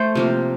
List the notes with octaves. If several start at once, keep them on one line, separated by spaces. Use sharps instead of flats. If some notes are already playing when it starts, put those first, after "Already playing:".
Already playing: A3 A4 C5
C3 F3 A#3